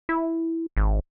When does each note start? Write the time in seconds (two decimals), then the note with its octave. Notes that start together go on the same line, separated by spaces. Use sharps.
0.09 E4
0.77 G#1